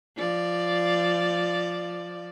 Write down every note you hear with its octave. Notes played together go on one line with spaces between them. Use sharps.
F3 D5